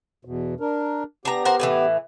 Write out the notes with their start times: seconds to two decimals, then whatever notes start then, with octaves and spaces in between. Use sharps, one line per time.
0.25 E2 B2
0.60 D4 A#4
1.25 B3 D4 G4 A#5
1.45 A#4 C5 F#5
1.60 A2 D3 E3